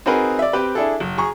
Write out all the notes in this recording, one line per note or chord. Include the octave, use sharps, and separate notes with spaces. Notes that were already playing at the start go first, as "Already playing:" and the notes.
C4 D#4 F#4 G#4 A#4 B4
D5 E5
C4 G4 B4
D4 E4 G#4 A4
F#1
G#4 A#5 C#6